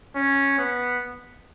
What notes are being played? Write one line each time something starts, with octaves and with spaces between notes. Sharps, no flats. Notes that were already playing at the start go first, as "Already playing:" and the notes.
C#4
B3